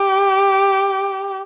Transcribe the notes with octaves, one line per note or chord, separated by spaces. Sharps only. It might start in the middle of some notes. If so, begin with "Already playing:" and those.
Already playing: G4